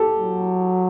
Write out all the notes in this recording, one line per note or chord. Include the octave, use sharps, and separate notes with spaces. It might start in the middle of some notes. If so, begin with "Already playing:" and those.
Already playing: G4 A4
F#3